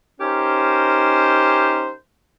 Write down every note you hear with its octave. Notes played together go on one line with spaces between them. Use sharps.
C#4 D#4 G4 A#4 C5